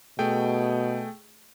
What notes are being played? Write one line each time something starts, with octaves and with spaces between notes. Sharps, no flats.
B2 A3 G#4 G5